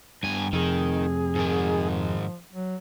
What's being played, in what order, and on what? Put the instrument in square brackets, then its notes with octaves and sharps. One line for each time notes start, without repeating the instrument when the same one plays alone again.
[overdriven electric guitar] G2 G#5 [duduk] B3
[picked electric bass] F2 C3 [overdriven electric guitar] D#3 [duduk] G#4
[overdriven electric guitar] G#2 D#3
[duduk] F3
F#3